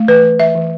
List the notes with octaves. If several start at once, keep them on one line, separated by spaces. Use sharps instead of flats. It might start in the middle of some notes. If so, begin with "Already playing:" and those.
Already playing: A3
E3 B4
E3
E3 E5
E3